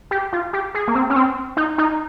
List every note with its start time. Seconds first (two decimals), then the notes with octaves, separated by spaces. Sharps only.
0.11 G4
0.33 F4
0.53 G4
0.75 G#4
0.88 A#3
0.95 C4
1.10 C#4
1.16 C4
1.57 D#4
1.78 D#4